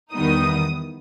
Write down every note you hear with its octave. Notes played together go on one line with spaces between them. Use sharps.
E2 D#3 G3 B3 D#4 D#6